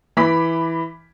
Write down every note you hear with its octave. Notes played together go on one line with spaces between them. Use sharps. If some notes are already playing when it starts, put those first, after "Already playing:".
E3 B5 D6 B6